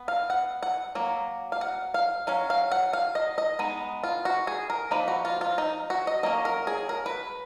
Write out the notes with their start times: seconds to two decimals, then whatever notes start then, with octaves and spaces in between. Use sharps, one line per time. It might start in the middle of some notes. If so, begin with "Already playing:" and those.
Already playing: B3
0.08 F5
0.30 F#5
0.63 F#5
0.95 F#3 A#3
1.52 F5
1.61 F#5
1.94 F5
2.27 F#3 C#4 F5
2.50 F5
2.71 F#5
2.93 F5
3.15 D#5
3.38 D#5
3.59 G#3 B3 D#4
4.04 F4
4.25 F#4
4.47 G#4
4.70 A#4
4.91 F3 A#3 D#4 B4
5.08 F#4
5.25 F4
5.41 F4
5.58 D#4
5.90 F#4
6.07 D#5
6.23 F#3 A#3 C#4 D#5
6.45 A#4
6.67 G#4
6.89 A#4
7.06 B4